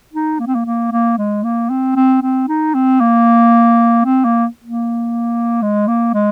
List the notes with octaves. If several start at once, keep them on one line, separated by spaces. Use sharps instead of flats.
D#4
A#3
C4
A#3
A#3
A#3
G#3
A#3
C4
C4
C4
D#4
C4
A#3
C4
A#3
A#3
G#3
A#3
G#3